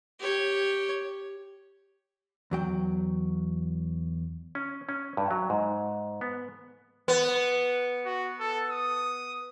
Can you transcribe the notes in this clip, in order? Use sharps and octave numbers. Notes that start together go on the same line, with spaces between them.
G4 C#5
E2 F#3 G5
C#4
C#4
G2
F#3
G#2
B3
B3
F#4
A4
D#6